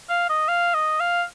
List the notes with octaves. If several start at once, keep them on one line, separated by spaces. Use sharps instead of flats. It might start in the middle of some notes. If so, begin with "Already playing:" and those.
F5
D#5
F5
D#5
F5